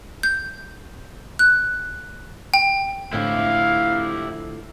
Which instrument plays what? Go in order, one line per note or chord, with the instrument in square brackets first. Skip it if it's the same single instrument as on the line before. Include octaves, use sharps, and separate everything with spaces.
[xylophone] G6
F#6
G5
[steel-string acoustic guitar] A2 D3 F3 [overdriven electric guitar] E4 G4 [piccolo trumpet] F5